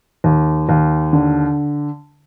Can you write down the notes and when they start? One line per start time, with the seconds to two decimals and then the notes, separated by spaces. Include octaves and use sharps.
0.24 D#2
0.69 D#2
1.13 D3